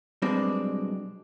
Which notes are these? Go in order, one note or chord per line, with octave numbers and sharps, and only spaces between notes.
B1 B2 G3 G#3 C4 D4